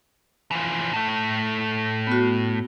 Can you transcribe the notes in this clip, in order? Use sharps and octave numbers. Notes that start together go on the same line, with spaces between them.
E3 F3
A2 A3
B3 F#4